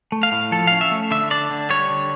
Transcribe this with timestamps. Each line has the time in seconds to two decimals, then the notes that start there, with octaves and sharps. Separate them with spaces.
0.12 A3
0.23 F5
0.32 A2
0.52 F3 A4
0.67 C#4 F5
0.81 E5
0.91 A3
1.11 D3 E5
1.31 D4 D5
1.51 D3
1.70 G3 C#5
1.90 D3